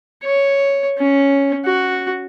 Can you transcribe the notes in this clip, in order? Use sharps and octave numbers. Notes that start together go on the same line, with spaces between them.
C#5
C#4
F#4